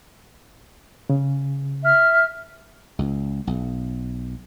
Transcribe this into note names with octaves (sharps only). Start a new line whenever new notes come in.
C#3
E5 F6
C#2
B1